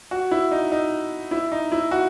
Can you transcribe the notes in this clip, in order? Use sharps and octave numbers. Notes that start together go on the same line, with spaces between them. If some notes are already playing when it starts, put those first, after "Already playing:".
F#4
E4
D#4
D#4
E4
D#4
E4
F#4